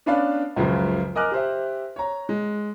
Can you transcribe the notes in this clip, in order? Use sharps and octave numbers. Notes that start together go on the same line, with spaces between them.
B3 C#4 D4 B4 D5 F5
C#2 F#2 C#3 F3 F#3
A#4 D#5 G#5 D6 F6 F#6
G4 C5 E5
C#5 A#5
G#3